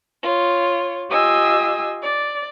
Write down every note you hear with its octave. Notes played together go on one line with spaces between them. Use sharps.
F4 C#5
F4 G4 D#5 G#5 E6
D5